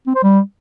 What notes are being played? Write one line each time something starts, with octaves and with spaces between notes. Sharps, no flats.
C4
C5
G3